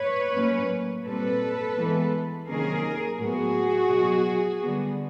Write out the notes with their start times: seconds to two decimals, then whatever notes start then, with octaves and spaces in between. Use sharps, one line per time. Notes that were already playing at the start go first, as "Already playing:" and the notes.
Already playing: B4 C#5
0.33 A2 F#3 A#3 C#4
1.05 A#2 G3 C4 A4 B4
1.76 E3 G#3 B3
2.47 C3 D#3 F#3 A#3 C#4 G#4 A#4
3.19 A2 F#3 B3 F#4 G#4
3.90 B2 F#3 B3
4.61 D3 G3 B3